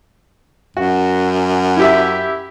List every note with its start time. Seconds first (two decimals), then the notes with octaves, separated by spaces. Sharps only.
0.77 F#2 F#4
1.77 E4 G4 E5